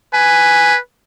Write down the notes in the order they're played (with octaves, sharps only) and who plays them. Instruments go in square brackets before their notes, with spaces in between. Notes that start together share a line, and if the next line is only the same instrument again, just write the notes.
[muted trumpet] B4 [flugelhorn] G#5